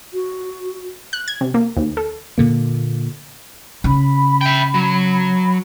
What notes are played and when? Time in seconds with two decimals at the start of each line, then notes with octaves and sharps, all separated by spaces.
0.14 F#4
1.13 F#6
1.28 G#6
1.41 C3
1.54 A#3
1.77 D#2
1.97 A4
2.38 A#2 D3 A#3
3.84 C#3 B5
4.41 E5 G5
4.74 F#3